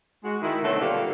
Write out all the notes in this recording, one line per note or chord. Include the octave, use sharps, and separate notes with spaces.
G#3 F#4
D#3 E4
B2 D3 F#3 A3 C4
G2 A#2 D3 D4 G4 F5